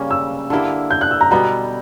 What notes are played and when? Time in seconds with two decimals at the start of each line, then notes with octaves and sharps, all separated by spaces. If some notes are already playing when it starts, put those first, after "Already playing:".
Already playing: C#3 G3 A#3 C#4
0.11 E6
0.50 D3 A#3 E4 G4
0.91 G6
1.01 F#6
1.11 E6
1.21 A#5
1.31 B2 G3 B3 A#5